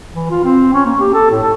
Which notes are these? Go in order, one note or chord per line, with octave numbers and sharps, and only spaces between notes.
E3
F4
C4
C#4
A#3
G4
A4
A2
A4